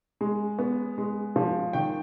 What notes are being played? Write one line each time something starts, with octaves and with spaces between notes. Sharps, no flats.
G#3
B3
G#3
F3
D#3 G5